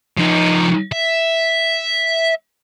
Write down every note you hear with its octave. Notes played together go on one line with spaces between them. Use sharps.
F3 D#4
E5